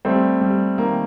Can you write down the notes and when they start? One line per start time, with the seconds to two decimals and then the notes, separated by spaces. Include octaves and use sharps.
0.05 G3 A3 C4
0.41 G3
0.78 D#3 A#3